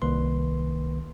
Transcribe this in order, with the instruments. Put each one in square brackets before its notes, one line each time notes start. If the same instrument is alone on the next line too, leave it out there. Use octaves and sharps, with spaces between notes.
[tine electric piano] C2 D#3 A#3 B4 C6